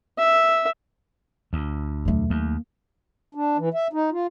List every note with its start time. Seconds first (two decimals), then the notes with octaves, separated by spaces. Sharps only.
0.19 E5
1.53 D2
2.05 E2 B2 F#3 A3
2.30 D#2 A#3
3.35 D4
3.58 E3
3.74 E5
3.93 D#4
4.12 F4